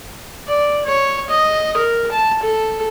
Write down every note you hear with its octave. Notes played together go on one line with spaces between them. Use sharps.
D5
C#5
D#5
A#4
A5
A4